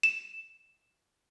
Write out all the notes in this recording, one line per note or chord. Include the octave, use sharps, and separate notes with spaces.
E7